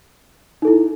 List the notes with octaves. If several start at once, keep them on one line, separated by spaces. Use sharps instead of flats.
D#4 E4 A4